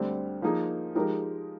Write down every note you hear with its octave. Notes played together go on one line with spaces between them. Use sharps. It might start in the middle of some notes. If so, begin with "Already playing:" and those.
Already playing: D2 D3 G3 C4
F3 A#3 D#4 G#4
F3 G#3 D#4 G4 A#4